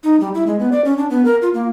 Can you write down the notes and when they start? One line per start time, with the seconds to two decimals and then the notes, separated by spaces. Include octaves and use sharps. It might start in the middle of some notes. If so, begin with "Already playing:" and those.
0.04 D#4
0.20 G3
0.34 E4
0.47 G#3
0.59 B3
0.72 D5
0.85 C#4
0.98 D4
1.10 B3
1.25 A#4
1.42 F4
1.54 A#3